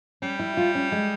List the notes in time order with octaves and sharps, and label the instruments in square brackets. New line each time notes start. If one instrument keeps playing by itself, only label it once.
[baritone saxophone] G3 [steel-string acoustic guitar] C#4
[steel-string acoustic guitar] E4
F4
C#4
G#3